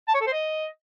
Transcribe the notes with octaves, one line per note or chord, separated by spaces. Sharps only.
A5
C#5
A4
C5
D#5